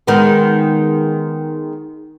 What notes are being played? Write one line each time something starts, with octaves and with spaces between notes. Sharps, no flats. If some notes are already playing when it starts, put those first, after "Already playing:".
D#3 G#3 B3